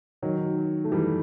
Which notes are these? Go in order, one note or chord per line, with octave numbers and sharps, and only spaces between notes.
D#3 F#3
A3
E3 G3